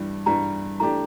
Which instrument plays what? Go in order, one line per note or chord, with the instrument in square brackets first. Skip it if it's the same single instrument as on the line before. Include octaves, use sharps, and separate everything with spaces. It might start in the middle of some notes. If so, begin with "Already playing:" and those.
Already playing: [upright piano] G2 E3 G3
[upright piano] G2 E3 G3 [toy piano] A#5
[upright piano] E3 A3 D4 G4 [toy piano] A#5